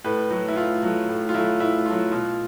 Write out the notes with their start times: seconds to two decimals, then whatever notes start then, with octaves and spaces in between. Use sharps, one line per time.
0.04 A2 B4
0.30 F#3 A3
0.48 E4
0.56 A2 F4
0.83 F#3 A3
1.09 A2
1.29 F4
1.34 F#3 A3 E4
1.60 A2 E4
1.86 F#3 A3 F4
2.12 B2 F4